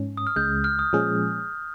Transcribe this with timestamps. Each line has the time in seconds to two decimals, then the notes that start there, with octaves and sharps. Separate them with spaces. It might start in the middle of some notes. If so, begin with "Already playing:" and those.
Already playing: G#2 C#4
0.17 D#6
0.27 F6
0.36 C#2 C#3 G#3 G6
0.64 F6
0.79 D#6
0.93 A#2 F3 G#3 C#4 G#4